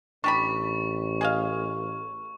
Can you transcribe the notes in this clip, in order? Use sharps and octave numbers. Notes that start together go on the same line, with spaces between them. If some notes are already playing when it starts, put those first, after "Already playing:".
A1 D4 G4 B5 C#6
G#4 D#5 F5